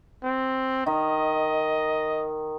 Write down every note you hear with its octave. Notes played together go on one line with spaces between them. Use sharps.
C4
D#3 D#5